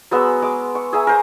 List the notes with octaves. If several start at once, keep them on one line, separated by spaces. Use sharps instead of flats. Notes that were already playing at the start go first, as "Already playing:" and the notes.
F#3 G#3 B3 E6
G#3 D6
C#6
G#4 E5 G#5 A#5
A#4 C5 A#5